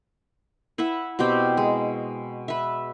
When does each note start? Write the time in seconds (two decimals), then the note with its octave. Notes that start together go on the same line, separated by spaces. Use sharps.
0.78 E4 B4 E5 F#5
1.19 B2 C4 G4 G5
1.57 G#3
2.48 B4 E5